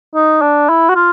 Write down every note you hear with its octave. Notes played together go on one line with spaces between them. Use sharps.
D#4
D4
E4
F#4
F4